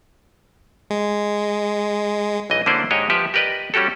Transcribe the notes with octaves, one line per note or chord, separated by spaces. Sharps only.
G#3
B1 E3 D#5
D3 A#3 C#4 E4 C5 D5
G#2 G#3 G4 C#5 D#5
F3 G4 B4 E5
G4 A#4 B4 D5 D#5
G3 C#4 F#4 G4 A4